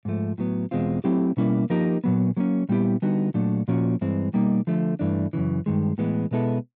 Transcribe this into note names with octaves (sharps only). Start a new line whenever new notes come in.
G#2 F3 A3
A2 F#3 B3
E2 B2 G#3 C4 F4
F#3 A3 C4 E4 G4
B2 G3 A#3 C#4 E4
F3 A#3 D#4 G4 A#4
A#2 F#3 B3
F#3 A#3 C#4
A#2 G3 B3 E4 G4
D3 G3 B3 D#4 F#4
A#2 F#3 A3 D4
A#2 F3 A#3 C#4 F#4
G2 E3 G#3 C4
B2 G3 A#3 D#4
D3 F3 A3
G2 E3 A3 D4
F#2 C#3 E3
G2 D#3 G#3
A2 E3 G#3 B3
B2 G#3 B3 E4 A4